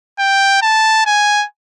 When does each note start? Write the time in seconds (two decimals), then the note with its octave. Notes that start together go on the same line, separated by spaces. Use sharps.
0.19 G5
0.62 A5
1.06 G#5